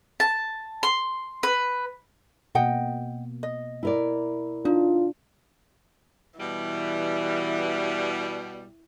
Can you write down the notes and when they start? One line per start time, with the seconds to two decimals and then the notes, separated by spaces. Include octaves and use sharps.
0.20 A5
0.83 C6
1.43 B4
2.55 B2 A#3 D#5 F#5 G5
3.43 D#5
3.83 E4 A#4 D5
4.65 D4 D#4 F4
6.40 B2 E3 G3